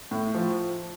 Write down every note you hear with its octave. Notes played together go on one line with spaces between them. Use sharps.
A2
F3